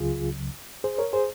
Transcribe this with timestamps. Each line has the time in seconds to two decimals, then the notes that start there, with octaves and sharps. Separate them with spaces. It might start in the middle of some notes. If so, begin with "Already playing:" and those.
Already playing: C#2 C#3 F#3 F4 G#4
0.84 G#4 C5
0.98 A#4 C#5
1.13 G#4 C5